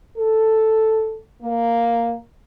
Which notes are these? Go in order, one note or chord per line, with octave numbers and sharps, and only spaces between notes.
A4
A#3